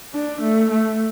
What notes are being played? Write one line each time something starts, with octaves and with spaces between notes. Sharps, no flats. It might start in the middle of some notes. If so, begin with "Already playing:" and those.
D4
A3
A3